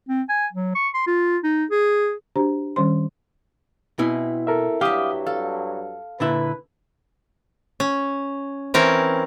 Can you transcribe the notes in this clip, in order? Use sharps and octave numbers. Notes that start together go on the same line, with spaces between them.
C4
G#5
F#3
C#6
C6
F4
D#4
G#4
D4 F#4 G4 C5 A#5
D#3 G3 C#4 C5 C6
B2 C4 E4 G#5
A4 A#4 E5
G2 F#3 G3 G4 E5 F5 D6 D#6
A4 F5
A#2 D3 E4 B4
C#4
E3 C4 C#4 A#4